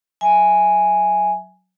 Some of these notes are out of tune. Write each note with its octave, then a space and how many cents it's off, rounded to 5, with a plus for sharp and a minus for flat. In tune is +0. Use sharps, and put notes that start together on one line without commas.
F#3 +0 E5 +0 G#5 +0